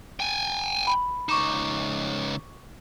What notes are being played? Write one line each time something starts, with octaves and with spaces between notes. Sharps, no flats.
G5 G#5
B5
C#2 D#4 C#6 D6 E7